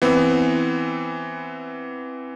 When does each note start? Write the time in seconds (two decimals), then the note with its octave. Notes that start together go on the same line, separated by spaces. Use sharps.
0.02 E3 B3 C4